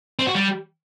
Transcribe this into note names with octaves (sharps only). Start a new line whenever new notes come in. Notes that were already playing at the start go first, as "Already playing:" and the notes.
C4
F#4
G3